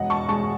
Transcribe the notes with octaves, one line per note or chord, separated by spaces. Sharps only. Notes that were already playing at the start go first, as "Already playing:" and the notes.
Already playing: E1 D#5 F#5
A5 C#6
G#3 A5 C#6